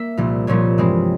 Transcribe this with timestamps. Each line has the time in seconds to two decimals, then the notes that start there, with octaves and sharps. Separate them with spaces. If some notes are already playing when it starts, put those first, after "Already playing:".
Already playing: A#3 A#4 E5
0.17 C2 A#2 F3
0.47 C2 A#2 F3 C#5
0.78 G2 E3 G#3 C4